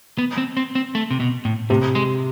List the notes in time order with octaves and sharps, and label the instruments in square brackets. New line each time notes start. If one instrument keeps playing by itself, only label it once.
[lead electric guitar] B3
C4
C4
C4
A3
C3
B2
A2
[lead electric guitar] A2 [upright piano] C3
[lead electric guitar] G#3